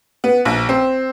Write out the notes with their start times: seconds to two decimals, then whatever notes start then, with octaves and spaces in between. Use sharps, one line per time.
0.24 B3
0.45 A#1
0.69 C4